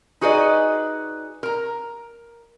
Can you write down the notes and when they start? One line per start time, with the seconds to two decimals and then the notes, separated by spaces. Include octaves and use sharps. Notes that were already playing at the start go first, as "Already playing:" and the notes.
0.21 D#4 F#4 G#4 B4 D5 D#5
1.43 A#4 A#5